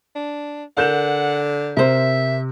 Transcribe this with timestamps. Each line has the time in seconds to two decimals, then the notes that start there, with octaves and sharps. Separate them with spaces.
0.16 D4
0.77 D3 A#4 F#5 G6 E7
1.77 C3 A#4 C5 E5